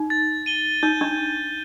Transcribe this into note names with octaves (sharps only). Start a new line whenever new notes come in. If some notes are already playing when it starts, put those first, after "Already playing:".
Already playing: D#4
A6
D#7 G7
D#4 G6
D4